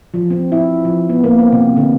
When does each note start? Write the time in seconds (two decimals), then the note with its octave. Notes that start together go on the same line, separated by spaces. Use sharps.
0.14 F3
0.30 C4
0.52 E4
0.85 F3
1.09 B3
1.24 A#3
1.39 C4
1.52 C3
1.77 D3